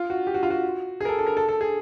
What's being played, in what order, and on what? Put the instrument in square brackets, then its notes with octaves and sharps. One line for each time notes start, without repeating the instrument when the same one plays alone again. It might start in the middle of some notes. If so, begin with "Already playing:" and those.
Already playing: [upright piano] F4
F#4
G4
F#4
F4
F#4
G#4
A#4
A4
A4
A#4
A4
A4
G#4